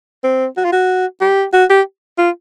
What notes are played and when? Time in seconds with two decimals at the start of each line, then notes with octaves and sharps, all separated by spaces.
0.24 C4
0.57 F#4
0.65 F4
0.72 F#4
1.21 G4
1.53 F#4
1.70 G4
2.18 F4